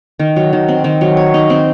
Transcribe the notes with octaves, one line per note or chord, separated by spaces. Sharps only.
D#3
F#3
D#3
C4
D#3
F#3
C#5
D#4
C4